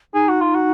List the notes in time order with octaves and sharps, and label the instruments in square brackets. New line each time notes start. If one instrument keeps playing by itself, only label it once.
[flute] D#4 [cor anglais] G#4
[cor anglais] F#4
F4
F#4